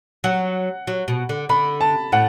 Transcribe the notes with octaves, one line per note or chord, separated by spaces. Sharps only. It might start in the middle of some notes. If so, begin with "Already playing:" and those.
F#3 F#5
F#3
B2
D3
D3 B5
A5
A2 F#5